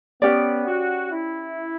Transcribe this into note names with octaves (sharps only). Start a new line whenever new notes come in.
B3 C#4 G4 D5
F#4
E4